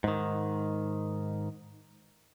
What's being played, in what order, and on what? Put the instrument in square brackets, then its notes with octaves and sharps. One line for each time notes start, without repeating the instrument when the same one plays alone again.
[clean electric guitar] G#2 D#3